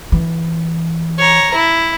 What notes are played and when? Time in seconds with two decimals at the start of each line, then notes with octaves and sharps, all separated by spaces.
0.12 E3
1.19 C#5 A#5
1.54 E4